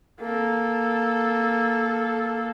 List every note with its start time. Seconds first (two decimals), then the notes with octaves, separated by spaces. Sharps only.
0.21 A#3 A4